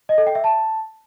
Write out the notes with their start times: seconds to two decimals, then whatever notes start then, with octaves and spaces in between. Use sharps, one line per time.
0.09 D#5
0.18 A4
0.27 G5
0.35 E5
0.44 A5